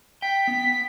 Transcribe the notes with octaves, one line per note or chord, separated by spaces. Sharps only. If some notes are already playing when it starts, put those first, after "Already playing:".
G5 B6
B3